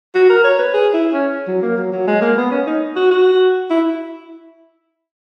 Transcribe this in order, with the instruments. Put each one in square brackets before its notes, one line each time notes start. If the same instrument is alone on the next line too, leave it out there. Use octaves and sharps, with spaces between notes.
[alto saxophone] F#4
A#4
C#5
B4
G#4
E4
C#4
F#3
A#3
F#3
F#3
G#3
A#3
B3
C#4
D#4
F#4
F#4
E4